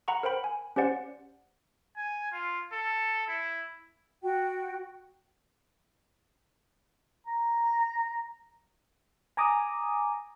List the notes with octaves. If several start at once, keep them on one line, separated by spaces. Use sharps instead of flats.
F#5 A#5 B5 C#6
A#4 C5 F#5 G5 B5
G#5
C#4 G4 C5 D5 F#5
G#5
F4
A4
E4
F#4 G5
A#5
G#5 A#5 D6 D#6